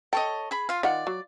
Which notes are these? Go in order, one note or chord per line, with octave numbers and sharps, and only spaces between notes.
A4 C#5 D#5 G5
G#4 B5
F4 F5
D#3 F4 D5 F#5
F#3